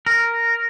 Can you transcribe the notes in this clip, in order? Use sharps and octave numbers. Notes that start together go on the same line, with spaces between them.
A#4